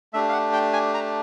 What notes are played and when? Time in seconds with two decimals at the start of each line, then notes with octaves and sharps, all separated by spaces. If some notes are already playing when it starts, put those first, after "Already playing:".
0.13 A3 D4 G4 E5
0.29 F5
0.32 F#5
0.53 G5
0.73 G#5
0.94 A#5